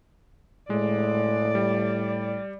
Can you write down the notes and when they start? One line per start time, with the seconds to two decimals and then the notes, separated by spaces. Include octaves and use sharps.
0.70 A2 G#3 D5
1.55 G3